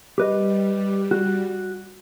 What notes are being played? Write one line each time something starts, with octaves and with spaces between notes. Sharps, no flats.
G3 G4 B4 D#5
F#4